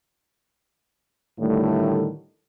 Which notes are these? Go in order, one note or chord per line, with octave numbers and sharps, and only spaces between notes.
A2 D3 D#3 G3 A3